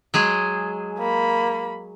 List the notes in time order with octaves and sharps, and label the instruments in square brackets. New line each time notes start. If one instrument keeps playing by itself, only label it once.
[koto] F#3 G#3 G#4
[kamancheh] A#3 B5